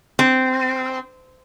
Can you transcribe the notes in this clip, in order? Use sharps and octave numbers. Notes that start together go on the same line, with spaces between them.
C4